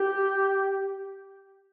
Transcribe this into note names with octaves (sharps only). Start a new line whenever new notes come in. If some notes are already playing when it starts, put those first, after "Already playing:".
Already playing: G4